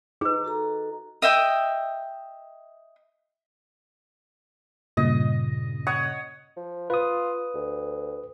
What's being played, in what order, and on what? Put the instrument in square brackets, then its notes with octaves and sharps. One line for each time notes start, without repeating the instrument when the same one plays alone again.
[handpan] D#4 [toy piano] G#4 B4
[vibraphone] F#4 A4 A#5
[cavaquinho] D#5 E5 G5 D#6
[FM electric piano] G2 A#2 C#3 [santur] D#5
[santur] C#5 F#5 D#6
[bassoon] F3
[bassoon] F4 [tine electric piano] B4 D#6
[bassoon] D2